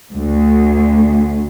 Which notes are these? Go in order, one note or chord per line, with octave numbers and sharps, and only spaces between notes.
D2